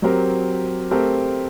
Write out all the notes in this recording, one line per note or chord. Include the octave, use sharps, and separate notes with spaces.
F#3 C4 G4 A#4
A3 C4 G4 A#4